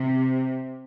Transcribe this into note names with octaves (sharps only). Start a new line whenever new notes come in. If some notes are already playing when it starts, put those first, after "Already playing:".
Already playing: C3